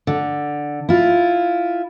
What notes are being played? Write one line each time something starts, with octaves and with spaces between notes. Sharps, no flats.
D3
E4 F4